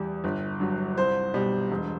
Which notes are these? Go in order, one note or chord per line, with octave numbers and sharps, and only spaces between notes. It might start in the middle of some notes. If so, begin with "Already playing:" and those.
Already playing: E2 G3
G1
G2 F#3
C2 C5
B2 G3
E1